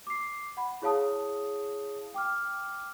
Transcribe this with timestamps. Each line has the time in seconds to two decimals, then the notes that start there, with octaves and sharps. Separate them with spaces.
0.07 D6 C7
0.57 F#5 B5
0.82 E4 G#4 C#5 F5 A5 D#6
2.14 G5 D6 F6